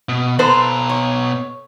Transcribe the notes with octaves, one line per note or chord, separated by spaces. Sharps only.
B2
B2 A4 B4 C5 A#5
C#5